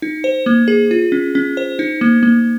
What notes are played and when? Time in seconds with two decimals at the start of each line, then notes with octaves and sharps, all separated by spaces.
0.02 D#4
0.24 C5
0.46 A#3
0.68 G#4
0.91 F4
1.12 C#4
1.35 C#4
1.57 C5
1.79 D#4
2.01 A#3
2.23 A#3